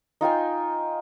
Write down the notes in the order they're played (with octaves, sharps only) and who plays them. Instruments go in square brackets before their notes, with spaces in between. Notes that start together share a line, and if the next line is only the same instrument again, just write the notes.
[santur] D#4 F4 G5 G#5